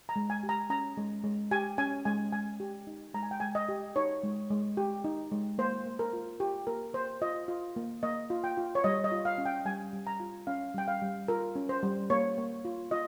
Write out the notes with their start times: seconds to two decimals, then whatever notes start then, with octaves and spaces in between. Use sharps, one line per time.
0.09 A#5
0.16 G#3
0.30 G#5
0.43 G4
0.49 A#5
0.70 C#4 A#5
0.97 G#3
1.24 G#3
1.51 G4 G#5
1.78 C#4 G#5
2.05 G#3 G#5
2.32 G#3 G#5
2.60 G4
2.87 D#4
3.14 G#3 A#5
3.23 G#5
3.31 G5
3.40 G#3 G#5
3.55 D#5
3.69 G4
3.96 D#4 C#5
4.23 G#3
4.50 G#3
4.77 G4
5.04 D#4
5.32 G#3
5.58 A#3 C5
5.86 A#3
5.99 A#4
6.13 F4
6.40 F4 G4
6.67 A#3 A#4
6.94 A#3 C5
7.22 F4 D#5
7.48 F4
7.76 A#3
8.03 A#3 D#5
8.30 F4
8.44 G5
8.57 F4
8.75 C#5
8.84 G3 D#5
9.04 D#5
9.12 F4
9.25 F5
9.38 C#4
9.46 G5
9.65 G3 G#5
9.93 G3
10.07 A#5
10.20 F4
10.47 C#4 F5
10.74 G3 G5
10.88 F5
11.02 G3
11.28 F4 A#4
11.56 C#4
11.69 C5
11.83 G3
12.10 A#3 C#5
12.37 A#3
12.65 F4
12.91 F4 D#5